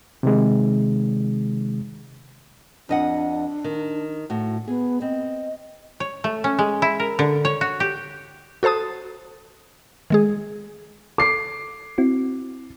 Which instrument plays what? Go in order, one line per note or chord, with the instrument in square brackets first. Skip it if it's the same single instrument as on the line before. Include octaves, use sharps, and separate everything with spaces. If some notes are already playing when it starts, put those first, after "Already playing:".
[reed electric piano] C3 D#3 G#3
[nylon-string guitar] F2 D#5 F#5 [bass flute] D4
[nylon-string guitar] D#3
A2 F#4
[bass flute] B3 [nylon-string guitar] G#4
[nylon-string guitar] C4 [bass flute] D#5
[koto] C#5
A3
C#4
G#3
E4
A#4
D3
C#5
F#4
G4
[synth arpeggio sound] F#4 A4 C5 A5 D#6
D#3 G#3 G#4
[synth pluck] A4 [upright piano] D6 C7
[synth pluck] C4 E4 F#4